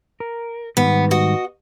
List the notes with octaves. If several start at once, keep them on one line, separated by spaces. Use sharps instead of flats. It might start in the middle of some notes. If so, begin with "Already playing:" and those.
A#4
G#2 D#3 G3 B3
F#4 D#5